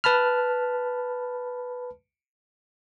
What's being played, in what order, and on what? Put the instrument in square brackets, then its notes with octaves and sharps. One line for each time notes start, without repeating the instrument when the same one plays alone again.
[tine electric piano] B4 A5 B5 F6